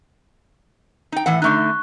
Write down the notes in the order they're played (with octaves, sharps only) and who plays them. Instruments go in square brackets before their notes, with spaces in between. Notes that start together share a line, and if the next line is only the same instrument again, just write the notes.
[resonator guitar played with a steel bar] D#4 G5
A2 E3 F#5
[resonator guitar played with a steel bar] D3 A3 D#4 [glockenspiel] C#6 F#6